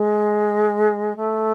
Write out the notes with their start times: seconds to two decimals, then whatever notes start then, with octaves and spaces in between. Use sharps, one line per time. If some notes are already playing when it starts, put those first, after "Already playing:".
Already playing: G#3
1.16 A3